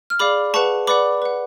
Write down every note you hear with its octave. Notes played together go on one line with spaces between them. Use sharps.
F6
G#4 D5 F5 B5 D6
G#4 B4 F#5 A5 C#6
B4 D5 F#5 B5 D6
B4 F#5